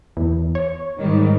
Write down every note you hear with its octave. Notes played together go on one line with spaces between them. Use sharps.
E2
C#5
G#2 D#3 G3